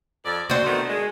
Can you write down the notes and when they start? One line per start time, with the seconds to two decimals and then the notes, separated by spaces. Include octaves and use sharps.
0.24 F2 D5
0.50 D4 F#4 C5
0.65 D#3 A3 B3
0.88 G#3